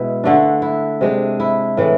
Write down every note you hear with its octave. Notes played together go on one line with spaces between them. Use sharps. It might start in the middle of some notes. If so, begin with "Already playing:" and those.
Already playing: B2 G#3 E4
D3 A3 D4
E4
C3 G#3 D4
E4
A2 E3 G#3